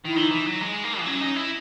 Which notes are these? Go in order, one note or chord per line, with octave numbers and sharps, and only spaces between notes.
D#3 E4
E3 D#4
E3
F#3
G#3
A#3
E3
F#3 C#4
D#4
E4